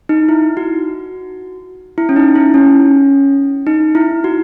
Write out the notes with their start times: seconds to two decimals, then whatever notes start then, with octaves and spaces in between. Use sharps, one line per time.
0.09 D#4
0.29 E4
0.57 F#4
1.98 E4
2.09 C#4
2.16 D#4
2.36 E4
2.54 C#4
3.67 D#4
3.95 E4
4.24 F#4